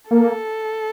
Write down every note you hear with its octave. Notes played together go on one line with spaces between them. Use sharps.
A#3 A4